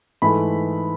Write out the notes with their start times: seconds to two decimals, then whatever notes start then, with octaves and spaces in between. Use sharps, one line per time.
0.22 G#2 E3 A3 B5